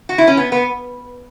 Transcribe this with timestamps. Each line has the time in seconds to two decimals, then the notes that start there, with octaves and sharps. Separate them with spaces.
0.09 F#4
0.18 E4
0.28 C#4
0.37 B3
0.52 B3